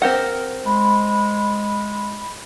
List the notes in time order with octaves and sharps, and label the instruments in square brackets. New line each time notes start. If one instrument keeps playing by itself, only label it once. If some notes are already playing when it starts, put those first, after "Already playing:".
[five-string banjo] C4 G4 F#5 [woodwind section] A#4
[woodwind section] G#3 [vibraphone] B5